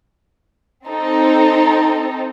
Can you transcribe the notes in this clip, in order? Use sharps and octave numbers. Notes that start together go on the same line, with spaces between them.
C4 D#4 A4